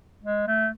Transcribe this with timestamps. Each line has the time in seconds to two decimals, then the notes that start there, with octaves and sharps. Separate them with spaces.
0.23 G#3
0.47 A3